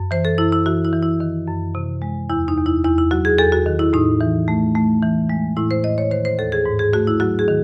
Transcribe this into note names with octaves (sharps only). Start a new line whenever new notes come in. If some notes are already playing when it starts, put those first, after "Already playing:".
Already playing: F#2
E3 C5
A4
F#2 E4
E4
E3 F#4
E4
E3
E4
D#3
F#2
C3
G#3
E2 E4
D#4
E2
E4
E2 E4
E4
F#3 F#4
G#4
E2 A4
F#4
D#3
E4
A2 D#4
E3
A3
A3
E3
G#3
A2 E4
C5
A2 D#5
C#5
D#3 C5
C5
D#2 A4
G#4
G#2
G#4
A3 F#4
E4
F#3 F#4
G#4
D#3